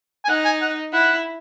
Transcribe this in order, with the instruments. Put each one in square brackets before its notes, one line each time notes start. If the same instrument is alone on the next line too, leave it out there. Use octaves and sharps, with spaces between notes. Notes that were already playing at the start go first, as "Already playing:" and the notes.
[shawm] G#5
[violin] D#4 [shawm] F#5
[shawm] G#5
F#5
[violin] E4 [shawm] F#5